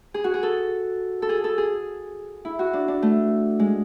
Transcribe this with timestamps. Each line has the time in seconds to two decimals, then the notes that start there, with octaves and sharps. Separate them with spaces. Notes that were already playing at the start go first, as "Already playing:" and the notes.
0.14 G#4
0.24 F#4
0.34 G#4
0.43 A4
1.22 A4
1.29 G#4
1.44 A4
1.58 G#4
2.45 E4
2.59 F#4
2.73 D4
2.88 D4
3.03 A3
3.59 G#3